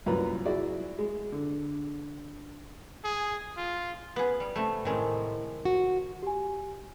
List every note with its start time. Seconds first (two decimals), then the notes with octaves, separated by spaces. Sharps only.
0.06 C2 F#2 A#2 B4 A#5
0.45 E4 F#4 G#4 D5
0.98 G#3
1.32 D3
3.04 G#4
3.57 F4
4.16 B3 G#4
4.40 G3
4.56 C3 A3
4.85 A2 D#3 G#3 C4
5.65 F#4
6.23 G4 G#5